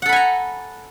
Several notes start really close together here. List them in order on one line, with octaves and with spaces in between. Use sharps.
F#5 A4 B5 G#5 A#5